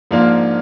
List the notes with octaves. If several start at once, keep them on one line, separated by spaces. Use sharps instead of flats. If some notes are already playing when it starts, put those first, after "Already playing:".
G#2 F3 A#3 D4 F4